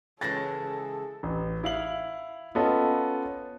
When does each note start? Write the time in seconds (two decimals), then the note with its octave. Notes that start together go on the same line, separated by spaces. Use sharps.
0.21 C#3 E3 G#3 A4 C#5 A6 A#6
0.61 G#4
1.23 A1
1.64 E4 F5 F#7
2.55 B3 C#4 F4 A4 D#5